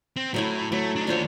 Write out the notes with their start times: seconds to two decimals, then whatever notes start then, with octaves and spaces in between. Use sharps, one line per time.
0.16 C4
0.34 A2 F#3 A3 E4
0.72 F#3 A3
0.96 D4 D#4
1.07 D#2 D4 F4 C5 C#5